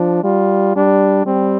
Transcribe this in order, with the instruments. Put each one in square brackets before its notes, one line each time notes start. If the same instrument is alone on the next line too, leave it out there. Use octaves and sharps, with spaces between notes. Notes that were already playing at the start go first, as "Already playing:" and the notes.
Already playing: [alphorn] F3 [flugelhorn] D4
[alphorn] G3 [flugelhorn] F4
[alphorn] G3 [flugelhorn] D4
[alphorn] G3 [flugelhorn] C4